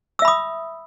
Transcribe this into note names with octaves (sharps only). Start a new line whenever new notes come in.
E5 B5 D#6 E6